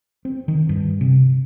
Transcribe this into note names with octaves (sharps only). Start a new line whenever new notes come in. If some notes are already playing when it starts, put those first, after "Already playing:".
C4
D#3
G2
C3